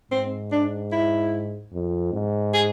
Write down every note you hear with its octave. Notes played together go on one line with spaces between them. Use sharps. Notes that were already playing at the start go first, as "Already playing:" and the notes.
G#2 C4
D4
E4
F2
G#2
G#4